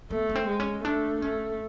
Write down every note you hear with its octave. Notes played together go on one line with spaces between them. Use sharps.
A3 B3
B3
C4
G#3
C#4
A3 D4
A3 C#4